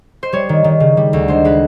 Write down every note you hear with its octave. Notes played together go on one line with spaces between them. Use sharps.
C5
G3 C#5
D#3
D#3
C#3
G3
D2
G#3 C5
G#3 B4